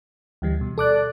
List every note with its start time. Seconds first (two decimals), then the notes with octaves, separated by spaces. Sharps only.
0.42 D2 E3 G3
0.61 B2
0.78 A4 D5 D6 F#6